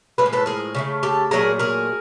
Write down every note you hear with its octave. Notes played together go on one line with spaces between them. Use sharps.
A2 F3 G#3 B4
C5
A4 B4
G#4 A#4
C#3 F#3 A3
G4 A4
A#2 F#3 A3 G#4 A#4
G#4 A#4